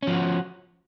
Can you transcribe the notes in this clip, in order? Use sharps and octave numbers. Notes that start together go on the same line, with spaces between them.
F3 C#4 F#4